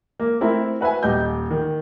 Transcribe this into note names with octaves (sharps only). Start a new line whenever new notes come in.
A#3
A3 C4 E4 A#4
F#4 B4 E5 G#5
D#1 G4 D#5 G6
D#3